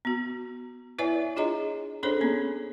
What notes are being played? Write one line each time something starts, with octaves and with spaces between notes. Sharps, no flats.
B3 F#4
E4 B4 C#5 D5 E5 G#5
D4 F4 G#4 C#5 D#5 A#5
C#4 D4 G#4 A4 C5 C#5
A#3 B3 C#4